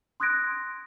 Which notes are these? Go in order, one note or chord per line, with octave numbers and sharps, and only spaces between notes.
C6 D#6 F#6 G#6 A#6 D7